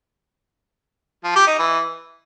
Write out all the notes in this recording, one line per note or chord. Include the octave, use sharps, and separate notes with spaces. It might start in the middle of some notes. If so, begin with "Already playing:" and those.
F3
G4
D#4
E3